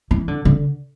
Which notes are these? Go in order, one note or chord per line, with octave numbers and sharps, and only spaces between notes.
E3
D3
D3